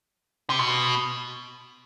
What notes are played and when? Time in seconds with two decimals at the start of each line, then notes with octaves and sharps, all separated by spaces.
0.50 C3
0.59 B2